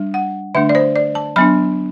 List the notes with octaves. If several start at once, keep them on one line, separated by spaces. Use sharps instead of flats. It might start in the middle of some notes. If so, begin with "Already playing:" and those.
Already playing: G3 D4
F#5
D3 A3 D4 E5
D5
C5
D5
A5
F#3 B3 D4 B5